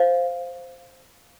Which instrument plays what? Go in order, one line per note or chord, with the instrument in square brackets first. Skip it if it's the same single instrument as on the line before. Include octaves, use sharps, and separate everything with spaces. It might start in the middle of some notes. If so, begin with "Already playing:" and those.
Already playing: [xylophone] C5 F5